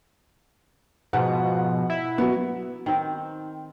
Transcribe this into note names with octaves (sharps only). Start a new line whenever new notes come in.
G#2 B2 F3 F#5
E4
F#3 B3
D#3 C4